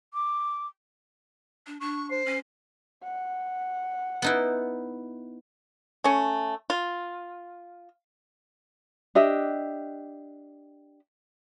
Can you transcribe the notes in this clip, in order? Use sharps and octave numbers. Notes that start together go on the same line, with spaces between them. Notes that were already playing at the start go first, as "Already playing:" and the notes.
D6
D4
D4 C#6
C5 C7
C#4
F#5
B3 D#4 E4
A3 C#4
F4
D4 G4 D#5 E5